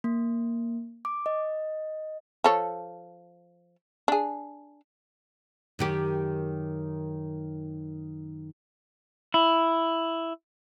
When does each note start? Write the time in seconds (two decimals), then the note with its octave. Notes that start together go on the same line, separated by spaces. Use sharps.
0.04 A#3
1.05 D6
1.26 D#5
2.44 F3 A4 C#5
4.08 D4 G#4
5.79 F#2 D#3 G4
9.34 E4